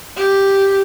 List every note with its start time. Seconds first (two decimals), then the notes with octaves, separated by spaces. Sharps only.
0.17 G4